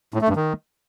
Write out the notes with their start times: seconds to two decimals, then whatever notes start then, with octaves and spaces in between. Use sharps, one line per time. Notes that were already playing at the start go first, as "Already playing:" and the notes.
0.14 A2
0.21 A3
0.29 G2
0.36 D#3